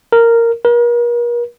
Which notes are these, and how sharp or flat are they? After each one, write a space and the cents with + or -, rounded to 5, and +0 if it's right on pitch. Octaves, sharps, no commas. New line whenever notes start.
A#4 -10
A#4 +40